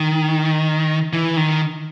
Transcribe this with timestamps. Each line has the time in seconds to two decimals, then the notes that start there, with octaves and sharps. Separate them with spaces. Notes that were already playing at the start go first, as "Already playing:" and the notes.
Already playing: D#3
1.13 E3
1.37 D#3